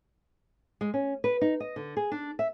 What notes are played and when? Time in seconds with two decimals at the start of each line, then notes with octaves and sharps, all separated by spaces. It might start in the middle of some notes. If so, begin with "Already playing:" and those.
0.81 G#3
0.94 C#4
1.24 B4
1.41 D#4
1.60 D#5
1.76 D3
1.97 G#4
2.12 D4
2.39 E5